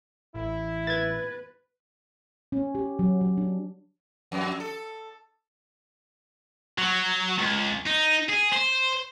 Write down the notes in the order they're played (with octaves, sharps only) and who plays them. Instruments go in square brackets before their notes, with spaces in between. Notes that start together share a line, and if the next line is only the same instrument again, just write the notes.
[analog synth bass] A1 [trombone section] E4
[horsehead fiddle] B4 [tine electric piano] G#6 A6
[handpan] C#4
G4
F#3
F#3
D4
[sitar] F2
A4
[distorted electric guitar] F#3
C#2
D#4
G#4
C5